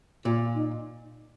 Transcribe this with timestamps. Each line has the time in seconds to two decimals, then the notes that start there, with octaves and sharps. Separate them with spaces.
0.25 A#2 F4
0.55 D#4